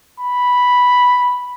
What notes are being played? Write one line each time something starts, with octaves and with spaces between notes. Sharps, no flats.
B5